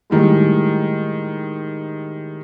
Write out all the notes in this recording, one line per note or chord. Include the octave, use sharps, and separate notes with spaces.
A2 D#3 G3 G#3